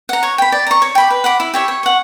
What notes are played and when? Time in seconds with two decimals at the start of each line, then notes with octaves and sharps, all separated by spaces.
0.09 F#5 A#5
0.23 C#5
0.38 G5 B5
0.52 D5
0.67 A#5 C#6
0.82 C#5
0.95 G5 B5 D6
1.10 B4
1.24 F#5 B5 D6
1.40 E4
1.54 G4 C#5 E5
1.68 C#5
1.83 F#5 C#6